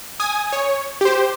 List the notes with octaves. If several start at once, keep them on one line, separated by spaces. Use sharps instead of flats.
G#5 D#6
C#5
G4 C5